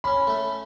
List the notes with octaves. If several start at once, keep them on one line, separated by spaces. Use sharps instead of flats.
C#4 B5
A3